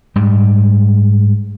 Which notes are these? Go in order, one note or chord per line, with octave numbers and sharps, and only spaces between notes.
G#2 G3